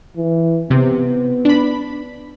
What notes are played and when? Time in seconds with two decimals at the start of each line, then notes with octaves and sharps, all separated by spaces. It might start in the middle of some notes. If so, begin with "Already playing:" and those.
0.17 E3
0.70 C3 B3
1.45 D4 B5